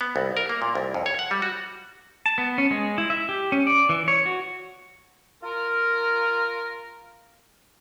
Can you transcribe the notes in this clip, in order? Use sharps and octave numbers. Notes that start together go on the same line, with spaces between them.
B3
C2
A#4
A#3
A#2
C2
F2
C#5
F#5
G3
F#4
A5
B3
C#4
G#3
E4
E5
G4
C#4
D5
E3
C#5
F#4
F4 A#4